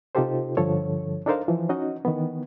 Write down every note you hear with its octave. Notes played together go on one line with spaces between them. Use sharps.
C3 D#4 F4 G4 A4 C5
G2 D3 F3 A4 C#5
D4 D#4 A4 A#4 C5 F5
E3 F3
C#4 D#4 F#4 D#5
D#3 E3 B3